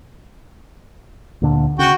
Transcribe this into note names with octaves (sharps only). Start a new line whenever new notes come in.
D2 A#2 D3
C#3 F#4 G5